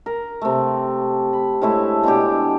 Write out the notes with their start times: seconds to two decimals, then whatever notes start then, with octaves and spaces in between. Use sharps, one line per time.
0.06 A#4
0.41 C3 A3
1.33 B5
1.62 A2 G#3 A3 E4
2.03 B2 G#3 D4 G4